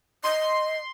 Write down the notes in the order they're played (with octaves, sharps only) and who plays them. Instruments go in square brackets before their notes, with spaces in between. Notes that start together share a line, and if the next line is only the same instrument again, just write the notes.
[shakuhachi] D#5 [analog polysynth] C6